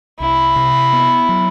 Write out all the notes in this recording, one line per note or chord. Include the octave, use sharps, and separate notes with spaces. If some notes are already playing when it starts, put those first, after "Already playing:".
C2 E4
C3
B3
F#3